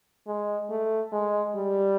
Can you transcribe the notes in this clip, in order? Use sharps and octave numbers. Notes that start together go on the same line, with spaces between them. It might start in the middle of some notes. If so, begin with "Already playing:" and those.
G#3
A3
G#3
G3